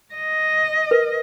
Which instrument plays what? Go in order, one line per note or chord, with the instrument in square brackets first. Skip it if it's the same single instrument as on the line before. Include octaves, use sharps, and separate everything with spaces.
[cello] D#5
[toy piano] A#4 B4